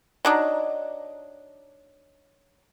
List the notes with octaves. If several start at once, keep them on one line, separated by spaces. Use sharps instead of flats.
F#3 D4 D#4